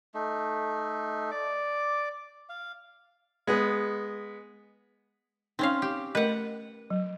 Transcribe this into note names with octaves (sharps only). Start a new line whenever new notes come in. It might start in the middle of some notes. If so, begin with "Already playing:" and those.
A3 D#4
D5 D6
F5
G#3 B3
C4 C#4 D#4 F5
G4
A3 A#4 B4 D#5 F#5
F#3